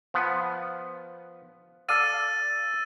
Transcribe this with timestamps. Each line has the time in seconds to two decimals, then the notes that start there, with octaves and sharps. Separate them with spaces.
0.14 F3 B3
1.89 A4 D5 F5 E6 A6 D#7